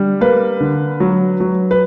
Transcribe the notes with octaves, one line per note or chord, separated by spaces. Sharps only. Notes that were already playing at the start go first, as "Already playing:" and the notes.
Already playing: D3 G3
A#3 B4
D3
F#3
F#3
B4